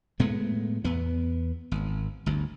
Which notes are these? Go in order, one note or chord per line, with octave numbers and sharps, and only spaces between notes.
A2 G#3 A3 B3
E2 B3
G#1
G1 D2